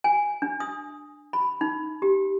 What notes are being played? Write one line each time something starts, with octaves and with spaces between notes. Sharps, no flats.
G#5
D4
D#6
B5
D#4
G4